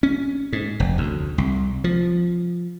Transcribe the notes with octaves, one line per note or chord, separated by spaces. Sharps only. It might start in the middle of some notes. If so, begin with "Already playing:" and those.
C#4
G#2
F1
D2
C2
F3